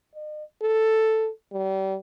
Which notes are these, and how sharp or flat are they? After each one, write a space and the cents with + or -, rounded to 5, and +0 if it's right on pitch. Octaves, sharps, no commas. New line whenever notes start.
D#5 -40
A4 +5
G3 -35